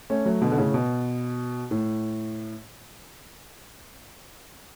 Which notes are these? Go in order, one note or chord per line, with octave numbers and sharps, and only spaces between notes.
A3 C#4
F#3 A3
B2 D3
D3
A2 C#3
B2
A2